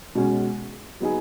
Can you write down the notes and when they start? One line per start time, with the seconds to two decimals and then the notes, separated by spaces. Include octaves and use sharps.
0.15 B2 G#3 C#4
1.00 F#3 B3 D#4 G#4